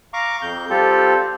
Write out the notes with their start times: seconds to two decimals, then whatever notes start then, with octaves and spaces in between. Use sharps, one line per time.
0.14 F5 A#5 C#6 D6
0.42 F2 G6
0.70 G3 C4 F4 G4 A4